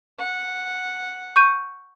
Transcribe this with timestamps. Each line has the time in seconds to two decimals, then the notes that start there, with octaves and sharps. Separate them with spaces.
0.19 F#5
1.36 C#6 G6 D#7